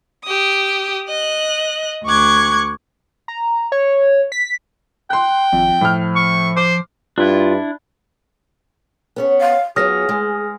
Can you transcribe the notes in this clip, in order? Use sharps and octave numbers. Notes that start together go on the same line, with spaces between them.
G4 D#6
D#5 F#6
D2 C#6 D6 F#6 G#6
A#5
C#5
B6
G5 C6 F#6
G#1 F2
A2 F3 F6
C#6
C5 D6
G2 D4 E4 F4
B3 C#4 C#5
F5
F#3 B3 F4 G#4 D#6 F6 A#6
G#3